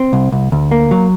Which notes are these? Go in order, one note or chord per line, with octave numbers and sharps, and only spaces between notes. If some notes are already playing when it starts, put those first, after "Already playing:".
Already playing: C4
C2
C2
D2
A#3
F#3